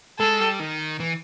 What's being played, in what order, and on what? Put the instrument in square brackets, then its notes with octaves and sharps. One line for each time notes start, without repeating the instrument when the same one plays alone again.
[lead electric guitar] G#3 [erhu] A4
[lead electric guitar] G3
D#3
E3